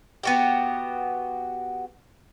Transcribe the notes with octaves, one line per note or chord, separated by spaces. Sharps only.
B3 F#4 G4